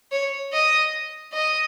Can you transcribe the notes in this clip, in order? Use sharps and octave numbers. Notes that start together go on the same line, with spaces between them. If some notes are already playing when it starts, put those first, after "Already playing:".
C#5
D#5
D#5